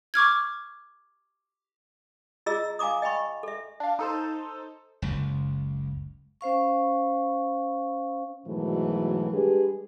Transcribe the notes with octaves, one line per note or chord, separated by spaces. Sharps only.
C#6 D6 F6 G#6
F4 G#4 D#5 A#5 E6
F5 G#5 A#5 D6 D#6
D#5 G5 G#5 B5 C#6
A4 E5
D4 F5
D#4 A4 C5
F#1 C#2
C#4 C5 F5 C#6
G#2 B2 D#3 E3 F#3 A3
G3 G#3 D4 G4 G#4 B4